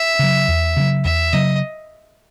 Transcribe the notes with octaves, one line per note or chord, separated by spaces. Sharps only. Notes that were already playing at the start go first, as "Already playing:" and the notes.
Already playing: E5
C#3 F#3
E2
C#3 F#3
E2 E5
C#3 F#3 D#5